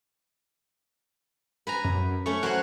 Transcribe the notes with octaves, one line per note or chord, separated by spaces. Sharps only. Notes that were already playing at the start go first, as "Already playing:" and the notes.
B4 G#5 A#5
F#2
A3 C#4 C#6
F#3 C5 C#5 F#6